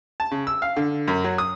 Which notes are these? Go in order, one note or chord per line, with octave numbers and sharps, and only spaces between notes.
A5
C#3
E6
F5
D3
F#2
F#3
D#6